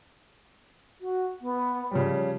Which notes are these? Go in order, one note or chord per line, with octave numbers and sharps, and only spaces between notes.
F#4
B3
C#3 F3 G3 C#5